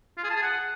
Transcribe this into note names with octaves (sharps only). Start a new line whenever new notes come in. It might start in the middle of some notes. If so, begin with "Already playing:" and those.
F4
G#4
A5
G#4
F#5